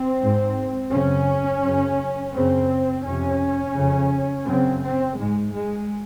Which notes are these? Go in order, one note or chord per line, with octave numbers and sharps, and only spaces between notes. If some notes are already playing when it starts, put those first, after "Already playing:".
Already playing: C4
G#2
F#2 C#3 C#4
F#2 C#3
F#2 C#3 C4
F2 C3 C#4
F2 C#3
F#2 C#3 C4
C4
G#2 G#3
G#3